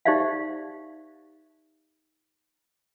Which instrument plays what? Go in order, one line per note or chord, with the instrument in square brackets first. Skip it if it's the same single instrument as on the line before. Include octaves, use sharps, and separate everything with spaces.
[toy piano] D#4 G4 C5 D5 E5 F5